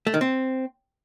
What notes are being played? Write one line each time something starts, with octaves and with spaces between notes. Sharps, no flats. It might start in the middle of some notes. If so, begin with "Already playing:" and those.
A3
D#3
C4